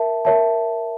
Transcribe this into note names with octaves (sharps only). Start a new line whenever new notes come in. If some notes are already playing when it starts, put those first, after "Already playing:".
Already playing: A#4 E5 A5
A#4 C#5 E5 A5